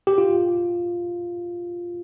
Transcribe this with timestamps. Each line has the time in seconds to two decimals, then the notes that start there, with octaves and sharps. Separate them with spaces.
0.07 G4
0.18 F4